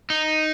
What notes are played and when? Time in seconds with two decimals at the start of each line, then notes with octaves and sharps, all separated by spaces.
0.10 D#4